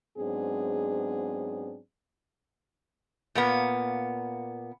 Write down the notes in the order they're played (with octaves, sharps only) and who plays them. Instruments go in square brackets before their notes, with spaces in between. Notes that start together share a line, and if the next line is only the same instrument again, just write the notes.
[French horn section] G#2 F#3 B3 C4 D4 G#4
[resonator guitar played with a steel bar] A#2 A#3 B3